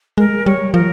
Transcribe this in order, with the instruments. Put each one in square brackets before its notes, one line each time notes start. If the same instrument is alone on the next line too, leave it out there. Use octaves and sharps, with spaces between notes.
[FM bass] G#3 [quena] A#4
[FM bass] G3 [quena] C#5
[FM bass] F3 [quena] A#4